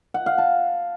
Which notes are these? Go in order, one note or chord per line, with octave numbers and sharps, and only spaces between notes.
F#5
F5
A5